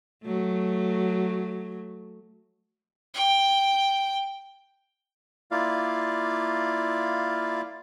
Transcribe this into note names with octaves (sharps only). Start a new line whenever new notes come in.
F#3 A3
G5
A#3 E4 F4 D5 F5